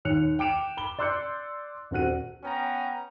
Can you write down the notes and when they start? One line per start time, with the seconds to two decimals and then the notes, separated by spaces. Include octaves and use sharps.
0.05 D#2 C#5 F#6 C#7 F7
0.39 G5 D6 D7 E7 F7
0.77 B5 G7
0.99 D5 C6 E6 F#6 G6 C#7
1.91 D#1 C4 F#4 F#6 D#7
2.42 B3 C#4 G5 A#5